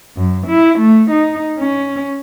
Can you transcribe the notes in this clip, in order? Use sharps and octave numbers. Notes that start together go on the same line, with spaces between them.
F#2
E4
A3
D#4
C#4